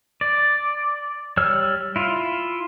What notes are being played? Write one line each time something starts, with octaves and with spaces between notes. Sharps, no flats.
D5
G3 C#5 E6 F6
E4 F4